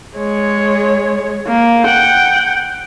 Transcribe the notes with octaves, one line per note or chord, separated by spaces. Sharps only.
G#3 C#5
A#3
F#5 G5